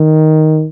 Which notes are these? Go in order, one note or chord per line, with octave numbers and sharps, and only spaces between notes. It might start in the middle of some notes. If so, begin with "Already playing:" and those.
Already playing: D#3